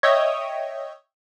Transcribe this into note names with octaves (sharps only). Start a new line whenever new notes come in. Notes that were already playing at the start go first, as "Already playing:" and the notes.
C#5 D#5 E5 G5 D#6 G#6